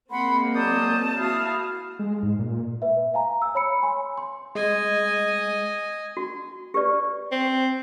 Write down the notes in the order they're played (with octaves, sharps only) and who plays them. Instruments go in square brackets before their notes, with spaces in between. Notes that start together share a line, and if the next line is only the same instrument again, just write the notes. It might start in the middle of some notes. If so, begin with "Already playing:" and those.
[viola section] G#3 A#3 C4 [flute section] F#5 B5 [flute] C6
[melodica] F#3 D5 D#6 [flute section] A5 [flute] G6
[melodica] E4 [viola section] F#4 F5 [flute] D#6
[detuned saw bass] G#3
G#2
A#2
[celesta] B4 E5
F5 G#5 A#5
E6
C#5 B5 C#7
G#5 C6
C6
[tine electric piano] G#3 [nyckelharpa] D#5 G#5
[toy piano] F#4
G4 B4 D5
[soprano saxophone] C4